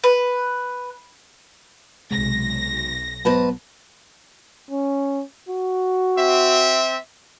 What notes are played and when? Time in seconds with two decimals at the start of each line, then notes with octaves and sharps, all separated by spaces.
0.04 B4
2.11 B1 C3 G#3 A#6
3.25 G#2 F#3 B3 B4 A5
4.71 C#4
5.49 F#4
6.17 C4 E5